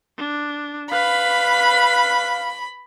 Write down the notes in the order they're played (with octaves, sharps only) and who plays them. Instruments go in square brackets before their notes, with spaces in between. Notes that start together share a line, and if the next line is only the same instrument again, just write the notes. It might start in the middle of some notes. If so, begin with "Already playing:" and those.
[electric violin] D4
[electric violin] B4 [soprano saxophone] F5 [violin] B5